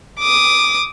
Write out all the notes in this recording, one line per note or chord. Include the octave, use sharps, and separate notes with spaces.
D6 D#6